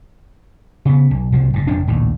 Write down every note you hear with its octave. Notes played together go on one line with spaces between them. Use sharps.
C#3 B3
B1
C2 F3
F#1 G2
F1 F2 D4
A#1 D#2 A2